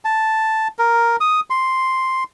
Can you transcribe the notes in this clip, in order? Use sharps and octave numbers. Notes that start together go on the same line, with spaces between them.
A5
A#4
D#6
C6